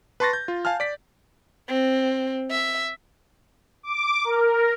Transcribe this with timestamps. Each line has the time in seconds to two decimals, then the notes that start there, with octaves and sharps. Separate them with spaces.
0.20 B4 A5 C6 C#6 A6 A#6
0.33 G6
0.48 F4
0.65 F5 G#5 A5 F6
0.80 D5 B6
1.68 C4
2.50 E5
3.83 D6
4.25 A#4